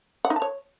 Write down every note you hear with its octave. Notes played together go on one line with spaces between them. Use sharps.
F#5
D#4
A5
C#5